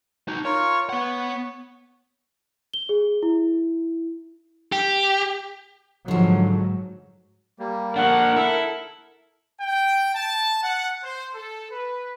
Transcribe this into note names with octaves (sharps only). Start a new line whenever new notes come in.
D#4 F#4
F4 A#4 C#5 C#6
B3 C#5 F#5
G7
G#4
E4
G4
G#2 D3 F3 F#3
G3 A#3
D3 A#3 D4 A#4 F#5
E4 A4
G5
A5
F#5
C5
A4
B4